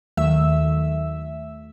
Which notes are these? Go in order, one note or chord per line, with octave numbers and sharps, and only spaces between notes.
D#2 D#3 F#3 A3 E5 E6